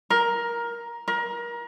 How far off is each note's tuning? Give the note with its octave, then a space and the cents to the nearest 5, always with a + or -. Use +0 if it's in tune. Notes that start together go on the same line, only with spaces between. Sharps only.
A#4 +15
A#4 +30